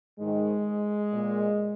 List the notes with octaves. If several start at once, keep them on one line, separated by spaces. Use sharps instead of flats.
G#2 D#3 G#3
A#2